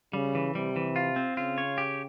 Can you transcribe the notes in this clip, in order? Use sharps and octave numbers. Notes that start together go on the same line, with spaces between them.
C#3 G3
E3
C3 G3
E3
F4
C4
C#3 F4
C#5
G4